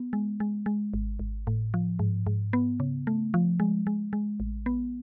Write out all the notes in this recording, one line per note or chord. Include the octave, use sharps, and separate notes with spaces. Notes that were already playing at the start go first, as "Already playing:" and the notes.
Already playing: B3
G#3
G#3
G#3
G#1
G#1
A2
F3
G#2
G#2
B3
C#3
A3
F3
G#3
G#3
G#3
A1
B3